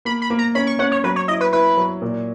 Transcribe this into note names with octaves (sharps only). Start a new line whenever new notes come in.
A#3 B5
B5
A#3
A#5
C#4 B5
C#6
C#4 F#5
C#5
F#3 B4
C#5
E4 D#5
B4
E4 B4
F#3
A#2